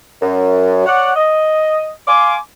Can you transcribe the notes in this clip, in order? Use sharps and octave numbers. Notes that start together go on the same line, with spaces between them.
F#2
C#5 D5 F#5
D#5
F5 G#5 C6 D6